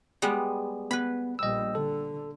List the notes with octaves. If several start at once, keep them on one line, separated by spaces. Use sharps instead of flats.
G3 G#3 B3
B3 B4 B5
A#1 G3 D#5 E6
D3 A4